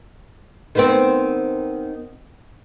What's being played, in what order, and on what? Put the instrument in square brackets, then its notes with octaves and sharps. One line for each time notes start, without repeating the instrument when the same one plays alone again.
[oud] D#3 B3 C4